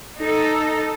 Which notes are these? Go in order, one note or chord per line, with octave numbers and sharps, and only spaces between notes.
D#4 A4